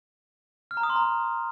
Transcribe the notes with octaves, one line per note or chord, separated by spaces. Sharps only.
F6
A#5
D#6
C6
A#5